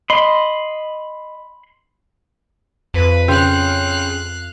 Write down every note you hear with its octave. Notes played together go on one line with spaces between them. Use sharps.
D#5 B5 C6
F2 B4
C#3 F5 G5 C6 F#6 G6